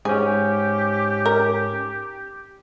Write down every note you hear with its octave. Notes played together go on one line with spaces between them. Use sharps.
G#2 C#4 G4 G#4
A#4